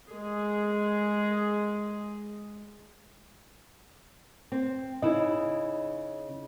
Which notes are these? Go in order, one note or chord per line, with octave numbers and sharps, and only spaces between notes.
G#3 G#4
C4
C#3 D#4 E4 D#5